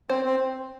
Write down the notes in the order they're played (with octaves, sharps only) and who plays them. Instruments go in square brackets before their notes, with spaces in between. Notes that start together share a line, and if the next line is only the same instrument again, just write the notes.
[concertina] C4 [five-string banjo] C5
[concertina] C4